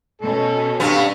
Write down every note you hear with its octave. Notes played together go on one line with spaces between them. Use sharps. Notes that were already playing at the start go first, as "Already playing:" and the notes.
B2 C#4 A4
G2 B3